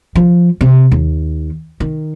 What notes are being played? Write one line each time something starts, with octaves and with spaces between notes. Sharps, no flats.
F3
C3
D#2
D#3